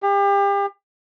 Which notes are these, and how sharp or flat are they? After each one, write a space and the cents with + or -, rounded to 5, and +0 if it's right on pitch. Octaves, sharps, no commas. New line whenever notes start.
G4 +35